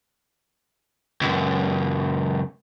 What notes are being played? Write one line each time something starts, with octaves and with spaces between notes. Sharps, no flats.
C#2 F#2